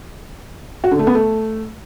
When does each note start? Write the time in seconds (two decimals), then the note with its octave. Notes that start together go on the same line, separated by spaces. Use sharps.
0.84 F#4
0.91 D3
0.99 A3
1.07 B3
1.15 A3